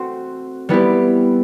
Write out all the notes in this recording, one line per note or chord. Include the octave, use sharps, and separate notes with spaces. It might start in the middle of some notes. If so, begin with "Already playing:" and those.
Already playing: A3 C4 F#4 C5
G3 B3 E4 G4